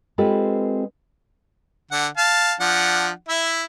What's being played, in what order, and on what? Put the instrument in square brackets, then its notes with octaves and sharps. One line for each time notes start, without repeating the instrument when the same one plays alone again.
[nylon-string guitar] G#3 C4 F4 G4 A4 B4
[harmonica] D3 F#5
F5 A5
F3 D4 F#5
E4 E5